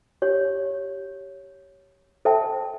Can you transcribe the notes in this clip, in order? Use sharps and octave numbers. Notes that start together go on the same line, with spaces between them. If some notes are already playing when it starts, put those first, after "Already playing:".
G4 C#5
A4 C5 E5 G5 A5